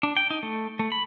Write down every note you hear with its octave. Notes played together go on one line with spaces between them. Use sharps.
D4
G5
D#4
A3
A3
B5